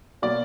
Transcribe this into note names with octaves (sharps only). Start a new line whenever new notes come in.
B2 F#3 A#3 D5